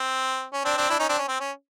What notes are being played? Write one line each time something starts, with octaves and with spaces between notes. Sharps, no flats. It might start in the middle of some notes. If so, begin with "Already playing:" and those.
Already playing: C4
C#4
C4 D4
C4 D4
D4 E4
C#4 D#4
C4 D4
C#4
C4
C#4